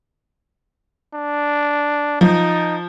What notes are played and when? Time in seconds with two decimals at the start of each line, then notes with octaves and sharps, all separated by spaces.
1.14 D4
2.21 F3 D#4